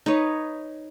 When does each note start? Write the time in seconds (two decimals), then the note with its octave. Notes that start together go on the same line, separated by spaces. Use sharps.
0.06 D#4 B4 C#5